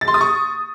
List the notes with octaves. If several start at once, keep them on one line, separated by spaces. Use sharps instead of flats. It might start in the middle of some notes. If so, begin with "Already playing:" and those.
A6
C6
D#6
C#6